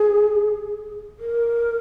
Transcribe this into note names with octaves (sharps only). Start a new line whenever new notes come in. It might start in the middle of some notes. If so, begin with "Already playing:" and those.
Already playing: G#4
A#4